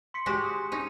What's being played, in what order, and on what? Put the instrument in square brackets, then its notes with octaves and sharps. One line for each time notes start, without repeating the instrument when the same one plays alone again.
[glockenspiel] C6 B6 C#7
[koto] G#3 F#4 G4
[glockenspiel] D#6
[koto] C#4 D#4 [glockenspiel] D#7